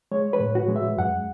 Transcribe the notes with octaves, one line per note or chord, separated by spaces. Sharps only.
G#3 C#5
B4
A2
F#4
G#3
E5
F#2 F#5